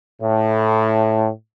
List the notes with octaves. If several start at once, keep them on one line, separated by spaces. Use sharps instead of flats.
A2